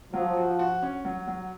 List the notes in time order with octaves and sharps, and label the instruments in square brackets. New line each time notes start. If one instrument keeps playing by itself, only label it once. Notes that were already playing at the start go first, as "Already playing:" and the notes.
[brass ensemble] F3 [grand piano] F#3
[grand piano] F#4
F#4
C#4
F#3
F#3